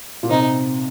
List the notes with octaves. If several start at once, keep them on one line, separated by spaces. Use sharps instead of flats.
A#2
C3 D#4